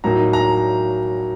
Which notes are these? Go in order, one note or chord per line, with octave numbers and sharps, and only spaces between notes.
A2 F#3 A#3 D#4 A#5
A#5